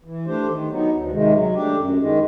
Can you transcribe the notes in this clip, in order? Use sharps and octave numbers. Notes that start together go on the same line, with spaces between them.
E3
A3 D4 G4 C5
D#3
F#3 B3 D#4
D2
C3 D#3 G#3
F#3
A3 D4 G4
F#2
D#3 G#3